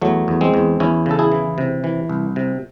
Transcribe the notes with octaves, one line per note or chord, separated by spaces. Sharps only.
E2 F#3 A3
E2
G#3 C4
E2
E2 C#4 E4
C#3 A4
E4 G#4
E3
C3
E3
C2
C3